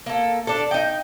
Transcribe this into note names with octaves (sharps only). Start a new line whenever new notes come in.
A#3 A4
D4 A4
D#4 G5